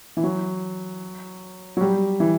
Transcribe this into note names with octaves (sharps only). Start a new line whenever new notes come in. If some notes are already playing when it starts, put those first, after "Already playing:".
E3
F#3
F#3
G3
E3